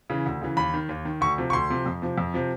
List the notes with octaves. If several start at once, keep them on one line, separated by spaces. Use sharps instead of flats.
C#3 E3
D2
C#3 E3
D#2 B5
D#3
D#2
D#3
D2 C#6
C3 F3
C#6
D2 C6
C3 F3
F2
C3 F3
F2
C3 F3